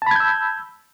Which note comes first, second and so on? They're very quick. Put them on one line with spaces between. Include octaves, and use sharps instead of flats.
A5 B5 G#6 G6 E6